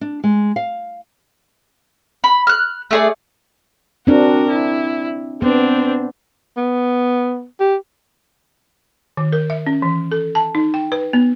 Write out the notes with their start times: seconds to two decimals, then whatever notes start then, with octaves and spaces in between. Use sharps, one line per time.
0.01 D4
0.24 G#3
0.56 F5
2.24 B5
2.47 F6 F#6
2.91 A3 G#4 D5
4.07 C4 D4 F#4 A#4
4.50 E4
5.42 B3 C4 D4
6.57 B3
7.60 G4
9.17 D#3
9.33 A#4
9.50 E5
9.67 C#4
9.82 E3
10.12 A4
10.35 A5
10.55 D#4
10.74 G5
10.92 B4
11.13 B3